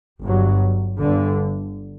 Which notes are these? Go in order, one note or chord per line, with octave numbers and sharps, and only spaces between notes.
G1 G2 F#3
G1 G2 D3